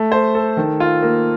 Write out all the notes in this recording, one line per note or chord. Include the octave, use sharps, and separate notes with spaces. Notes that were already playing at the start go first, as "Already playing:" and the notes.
Already playing: A3
C5
A4
D#3
F4
A#3